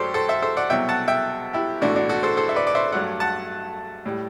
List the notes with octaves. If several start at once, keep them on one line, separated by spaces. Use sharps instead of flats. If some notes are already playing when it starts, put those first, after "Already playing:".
Already playing: F#2 F#3 A3 G4 A4 C5 D5
A4 C5
C5 E5
A4 C5
D5 F#5
C2 B2 F#3 E5 G5
F#5 A5
E5 G5
E4 G4
B1 A2 E3 A3 D4 F#4
D4 F#4
F#4 A4
A4 C5
A4 C5
E5
B4 D5
D5
C5 E5
G2 F#3 A3 D5 F#5
F#5 A5
A2 G3